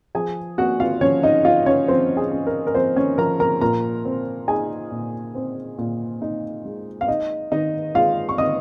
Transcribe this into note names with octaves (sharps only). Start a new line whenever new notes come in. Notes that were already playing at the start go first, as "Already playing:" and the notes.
F3 G#4 G#5
A#3 F#4 F#5
F4 F5
F3 C#4 C#5
D#4 D#5
C#4 F4 F5
C#4 C#5
F3 C4 C5
G#4
C#4
A#4
A#4
F3 C4 C5
C#4 C#5
F3 A#4 A#5
A#4 A#5
A#2 A#4 A#5
C4
D#4 G#4 G#5
A#2
C4
A#2
D#4
G#3
F5
D#4 D#5
D#3 D#4 D#5
G#3 F4 F5
C#6
D#4 D#5 D#6